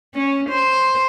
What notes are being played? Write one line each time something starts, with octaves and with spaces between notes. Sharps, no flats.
C#4
C5